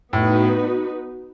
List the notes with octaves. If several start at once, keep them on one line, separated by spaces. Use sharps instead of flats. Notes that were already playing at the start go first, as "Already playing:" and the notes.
A2 B3 D#4 F#4 B4